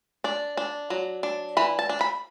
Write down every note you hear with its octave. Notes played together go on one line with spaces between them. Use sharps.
D4 D5
D4
F#3
D4
E3 B5
A5
D4
B5